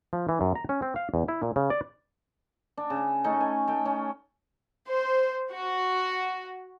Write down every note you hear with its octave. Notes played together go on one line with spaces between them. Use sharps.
F3
E3
F#2
A#5
C#4
C4
F5
E2
E4
A#2
C#3
D5
D4
C#3
A3 C#4 D#4 A4
G#5
A3 G5
C#4
C5
F#4